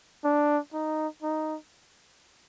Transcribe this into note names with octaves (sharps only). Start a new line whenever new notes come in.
D4
D#4
D#4